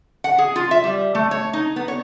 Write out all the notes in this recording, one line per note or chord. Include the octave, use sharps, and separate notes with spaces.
F#5
G#4
F4
E5
G3
A3
C#5
D#4
B3
C#5